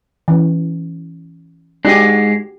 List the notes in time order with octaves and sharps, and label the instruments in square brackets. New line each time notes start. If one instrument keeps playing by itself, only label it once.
[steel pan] E3 C#4
[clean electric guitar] G#2 G#3 [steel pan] D4 F#4 G4